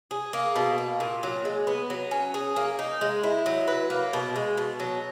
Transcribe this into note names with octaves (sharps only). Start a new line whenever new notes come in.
G#4
A#3
B2
A#3
A#2
F#3
G#3
B3
F#3
C#4
G#4
A#3
D#4
G#3
E4
F#3
B4
A#3
B2
G#3
B2
F#3